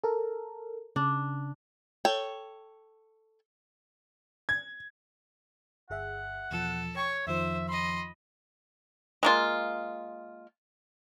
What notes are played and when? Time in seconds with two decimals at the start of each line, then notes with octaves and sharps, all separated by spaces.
0.04 A4 A#4
0.96 C#3 D4
2.05 A4 C#5 G5
4.49 G#6
5.90 G1 G#4 E5 F#5
6.51 E2 B2 F3 A4
6.96 C#5 G5 C#6
7.27 F2 D#3 F3 C5 E5
7.68 D#5 B5 C6
9.23 G#3 A#3 F4